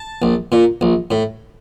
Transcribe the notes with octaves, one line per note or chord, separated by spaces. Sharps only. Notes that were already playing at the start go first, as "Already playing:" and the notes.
Already playing: A5
A#1
A#2
A#1
A2